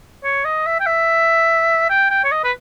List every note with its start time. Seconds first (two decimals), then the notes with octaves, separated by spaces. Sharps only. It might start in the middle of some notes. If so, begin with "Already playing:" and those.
0.24 C#5
0.45 D#5
0.66 E5
0.80 G5
0.86 E5
1.90 G5
2.10 G5
2.25 C#5
2.32 D#5
2.44 B4